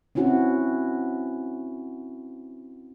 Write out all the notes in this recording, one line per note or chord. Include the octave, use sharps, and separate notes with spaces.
C4 C#4 E4 F#4